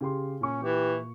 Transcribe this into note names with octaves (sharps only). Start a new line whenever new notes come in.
C#3 G4 C6
A#2 C#4 C#6
E3 G4